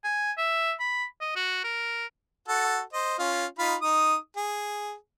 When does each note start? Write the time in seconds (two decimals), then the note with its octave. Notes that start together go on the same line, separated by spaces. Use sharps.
0.04 G#5
0.37 E5
0.79 B5
1.21 D#5
1.36 F#4
1.64 A#4
2.48 F#4 A4 F#5
2.93 C5 D#5
3.19 C#4 F4
3.59 D#4 F4 B5
3.82 D#4 D#6
4.37 G#4